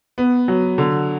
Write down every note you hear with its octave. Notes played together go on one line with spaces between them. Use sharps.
B3
F#3
D3